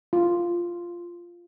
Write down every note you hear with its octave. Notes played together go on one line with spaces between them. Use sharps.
F4